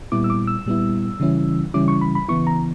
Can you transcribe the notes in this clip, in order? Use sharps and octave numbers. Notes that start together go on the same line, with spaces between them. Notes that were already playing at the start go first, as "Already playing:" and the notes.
A#2 G3 B3 E4 D6
E6
D6
E6
A#2 G3 B3 E4
C#3 E3 G3 C#4 E4
C#3 E3 G3 C#4 E4 D6
C#6
B5
B5
C#3 E3 B3 E4 C#6
A#5